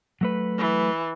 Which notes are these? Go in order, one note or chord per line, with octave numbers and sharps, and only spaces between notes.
F#3 A3 B4
E3